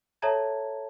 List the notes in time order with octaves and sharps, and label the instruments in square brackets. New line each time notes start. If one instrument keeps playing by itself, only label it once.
[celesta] A4 C#5 E5 A5 A#5 G#6